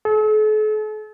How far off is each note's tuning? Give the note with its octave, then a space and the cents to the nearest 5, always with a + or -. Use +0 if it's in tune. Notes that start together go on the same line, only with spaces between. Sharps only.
A4 -45